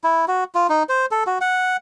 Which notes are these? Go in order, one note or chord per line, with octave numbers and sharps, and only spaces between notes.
E4
F#4
F4
D#4
C5
A4
F#4
F#5